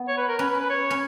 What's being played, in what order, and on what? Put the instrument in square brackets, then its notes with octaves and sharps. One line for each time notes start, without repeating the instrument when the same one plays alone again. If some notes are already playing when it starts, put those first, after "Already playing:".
Already playing: [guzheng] B3
[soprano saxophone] C#5
B4
A#4
[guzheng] C#4 [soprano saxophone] B4
[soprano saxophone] B4
B4
C#5
[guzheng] C#4